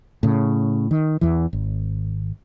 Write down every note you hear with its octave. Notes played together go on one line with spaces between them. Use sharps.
A2 C#3
D#3
E2 E3
G#1